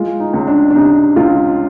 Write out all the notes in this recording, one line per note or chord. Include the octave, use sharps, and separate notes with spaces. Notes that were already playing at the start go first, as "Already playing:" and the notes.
Already playing: G#3 F4
D#4
C#2
D4
D4
C3 D#4
C#2 F4